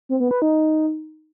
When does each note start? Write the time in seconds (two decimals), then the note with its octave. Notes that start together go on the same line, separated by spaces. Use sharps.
0.09 C4
0.20 B3
0.31 B4
0.42 D#4